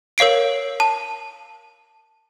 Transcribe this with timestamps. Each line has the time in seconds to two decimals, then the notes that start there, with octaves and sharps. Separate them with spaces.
0.18 A#4 C#5 F5 C7 D7
0.80 A5